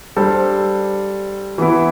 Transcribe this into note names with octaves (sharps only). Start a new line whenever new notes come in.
G3 D4 A4 C5
E3 B3 E4